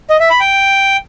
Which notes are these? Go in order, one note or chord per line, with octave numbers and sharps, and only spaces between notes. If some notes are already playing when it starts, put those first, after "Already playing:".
D#5
E5
B5
G5